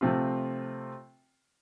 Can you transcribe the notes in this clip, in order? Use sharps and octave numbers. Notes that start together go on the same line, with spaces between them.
C3 F3 A3 C4 F4